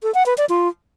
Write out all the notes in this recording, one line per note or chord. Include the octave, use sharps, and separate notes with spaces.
A4
F#5
B4
D5
F4